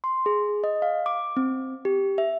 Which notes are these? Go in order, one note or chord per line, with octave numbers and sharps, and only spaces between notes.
C6
G#4
D#5
F5
D6
C4
G4
E5